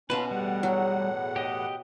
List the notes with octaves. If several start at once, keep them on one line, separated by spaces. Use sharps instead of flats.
B2 C#4 F4 B4 A5
E2 A2 G3 F#5
F#3
G4 D#5